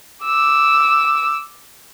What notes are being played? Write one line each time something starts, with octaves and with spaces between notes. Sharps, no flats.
D6 E6